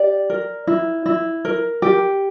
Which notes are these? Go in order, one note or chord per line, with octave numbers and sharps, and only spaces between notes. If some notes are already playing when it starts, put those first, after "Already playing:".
Already playing: G4 D5
A#4
E4
E4
A#4
G4